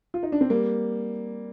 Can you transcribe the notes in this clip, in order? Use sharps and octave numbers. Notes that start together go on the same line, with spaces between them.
F4
D#4
D4
C4
G3 A#3